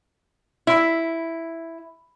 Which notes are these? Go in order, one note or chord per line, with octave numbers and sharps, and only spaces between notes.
E4